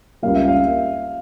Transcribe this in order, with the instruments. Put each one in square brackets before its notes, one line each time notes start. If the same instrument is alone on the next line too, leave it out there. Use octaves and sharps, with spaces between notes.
[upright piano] C#2 C#3 G3 A#3 F5
E5
F5